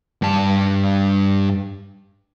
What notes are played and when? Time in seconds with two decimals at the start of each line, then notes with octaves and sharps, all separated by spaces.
0.22 G2 A5